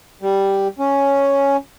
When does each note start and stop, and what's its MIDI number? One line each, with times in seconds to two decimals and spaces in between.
0.21 0.68 55
0.79 1.57 61